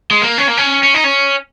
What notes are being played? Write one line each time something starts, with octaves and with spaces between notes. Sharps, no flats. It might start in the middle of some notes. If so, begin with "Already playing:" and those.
G#3
A#3
C#4
A#3
C#4
C#4
D#4
C#4